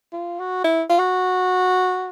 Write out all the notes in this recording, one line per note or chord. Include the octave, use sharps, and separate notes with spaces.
F4
F#4
E4
F4
F#4